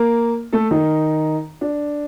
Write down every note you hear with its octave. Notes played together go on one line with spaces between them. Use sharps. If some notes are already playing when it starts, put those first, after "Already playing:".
Already playing: A#3 A#4
A3 A4
D#3 D#4
D4